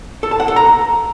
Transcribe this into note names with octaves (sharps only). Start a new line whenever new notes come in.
A4
A5
F#5
A4
A#5